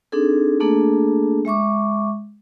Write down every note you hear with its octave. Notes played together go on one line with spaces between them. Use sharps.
C4 D4 D#4 G#4 A4
A3 A#3 D4 G#4 A4
G#3 E5 C#6 D6